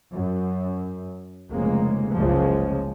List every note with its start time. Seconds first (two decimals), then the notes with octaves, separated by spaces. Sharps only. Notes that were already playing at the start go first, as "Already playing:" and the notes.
0.12 F#2
1.50 F1 C#3 G#3 A#3
2.16 F#1 C#2 C#3 F3 G#3